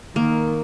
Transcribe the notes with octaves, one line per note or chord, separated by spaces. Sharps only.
D#3 A#3